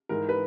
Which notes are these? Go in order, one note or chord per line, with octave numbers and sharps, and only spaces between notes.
G#2 E3 A#4
B4